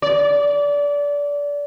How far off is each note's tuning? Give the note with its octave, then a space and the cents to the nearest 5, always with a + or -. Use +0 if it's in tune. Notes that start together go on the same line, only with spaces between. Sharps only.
D5 -25